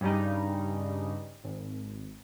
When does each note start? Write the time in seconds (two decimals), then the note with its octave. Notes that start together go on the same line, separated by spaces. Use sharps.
0.01 G2 C#3 G3 D#4
1.44 G#1